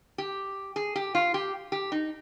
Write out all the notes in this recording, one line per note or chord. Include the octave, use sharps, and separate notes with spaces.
G4
G#4
G4
F4
G4
G4
D#4